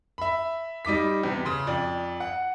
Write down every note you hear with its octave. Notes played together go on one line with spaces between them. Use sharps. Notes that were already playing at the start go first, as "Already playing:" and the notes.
E5 B5
G3 D#4 D6 B6
E2 C3
C#3 C6
F2 D5
F#5